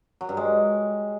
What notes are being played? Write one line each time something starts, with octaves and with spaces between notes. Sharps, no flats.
F#3
G2
G#3